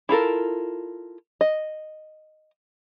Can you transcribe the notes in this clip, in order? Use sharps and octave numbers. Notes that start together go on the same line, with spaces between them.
E4 F4 A4 A#4
D#5